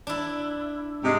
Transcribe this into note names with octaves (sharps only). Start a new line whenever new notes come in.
D4 E4
G#2 C3 G#3